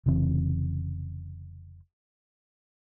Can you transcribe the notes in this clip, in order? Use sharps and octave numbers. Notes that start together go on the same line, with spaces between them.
F1 C#3 E3 C4